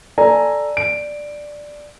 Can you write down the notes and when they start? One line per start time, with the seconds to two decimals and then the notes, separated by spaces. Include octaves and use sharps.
0.18 A4 D5 G#5 A#5
0.77 D7